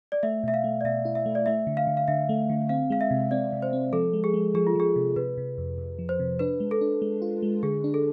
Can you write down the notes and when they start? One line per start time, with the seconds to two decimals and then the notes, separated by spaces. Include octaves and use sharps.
0.12 D5
0.23 A3 E5
0.43 B2 E5
0.54 F5
0.64 A3
0.81 D5
0.84 B2 E5
1.05 E4
1.15 E5
1.26 A3
1.35 D5
1.46 A3 E5
1.67 D3
1.77 F5
1.87 D3
1.97 F5
2.08 D3 E5
2.29 A3
2.50 D3
2.69 C4 F5
2.90 G#3 F5
3.01 E5
3.11 C3
3.31 C4 D5
3.53 C3
3.62 C5
3.73 C4
3.93 F3 A4
4.13 G#3
4.24 G#4
4.34 G#3
4.54 F3 G#4
4.67 F4
4.75 F3 G#4
4.96 C3
5.16 C3 B4
5.38 C3
5.58 F2
5.78 F2
5.99 F3
6.09 C5
6.20 C3
6.40 D4 B4
6.60 G#3
6.71 A4
6.81 D4
7.02 G#3
7.22 F4
7.43 G#3
7.63 D3 G#4
7.84 D4
7.94 A4